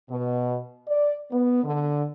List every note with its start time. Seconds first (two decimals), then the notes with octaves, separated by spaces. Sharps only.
0.10 B2
0.88 D5
1.32 B3
1.64 D3